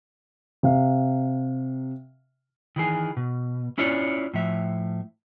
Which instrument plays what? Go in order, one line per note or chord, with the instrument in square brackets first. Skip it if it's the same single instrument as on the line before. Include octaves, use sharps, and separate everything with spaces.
[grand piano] C3 F5
[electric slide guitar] D#3 E3 G#4
B2
C#4 E4 F4 C#5 D5
A2 F3 E5